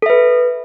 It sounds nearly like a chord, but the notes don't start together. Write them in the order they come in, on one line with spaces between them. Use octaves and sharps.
A4 E5 B4